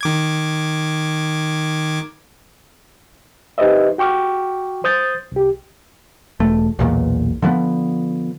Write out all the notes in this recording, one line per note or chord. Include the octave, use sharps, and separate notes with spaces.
D#3 D6 G#6
D#4 G4 B4 C5 D#5 E5
F#4 G5 C#6 D6 F6
C5 D#6 G6 A6
C2 G4
E1 A3
B1 E2 A#2
D3 F3 G3 B3